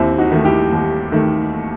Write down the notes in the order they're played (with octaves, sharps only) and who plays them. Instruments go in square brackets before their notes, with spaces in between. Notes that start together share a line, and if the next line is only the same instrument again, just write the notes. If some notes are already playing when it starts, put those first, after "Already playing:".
Already playing: [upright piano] D#2 C4 E4
D#4 F#4
D#3 A3
E4 G4
D#2
D#3 A3